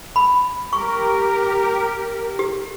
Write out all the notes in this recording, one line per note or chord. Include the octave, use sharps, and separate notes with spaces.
B5
G4 A#4 C#6
G4